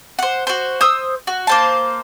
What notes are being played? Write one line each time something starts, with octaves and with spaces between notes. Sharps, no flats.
C5 F#5
F#4 C5
C5 D#6 E6
F#4
A#3 C5 A5